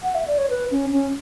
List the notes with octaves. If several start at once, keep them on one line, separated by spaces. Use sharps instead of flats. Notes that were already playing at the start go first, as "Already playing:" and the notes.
F#5
E5
D5
C#5
B4
C#4
C#4